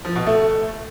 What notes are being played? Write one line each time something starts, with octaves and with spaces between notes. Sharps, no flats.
F3
B2
A3